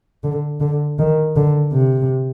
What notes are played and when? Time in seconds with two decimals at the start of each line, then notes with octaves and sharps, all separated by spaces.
0.24 D3
0.60 D3
0.99 D#3
1.36 D3
1.73 C3